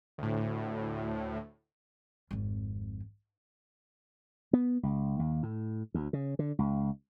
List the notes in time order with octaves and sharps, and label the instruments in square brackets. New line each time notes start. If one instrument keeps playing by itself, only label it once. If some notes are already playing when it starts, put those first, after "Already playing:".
[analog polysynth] D2 A2
[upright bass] G#1 F2
[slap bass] B3
C#2
D#2
A2
D2
C#3
D3
C#2